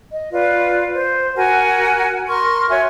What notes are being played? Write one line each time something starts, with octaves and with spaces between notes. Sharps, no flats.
D#5
F4 B4 D5
C5
F#4 A#4 F#5 G#5
A#4 C6 C#6 F6
F#4 C#5 E5 G#5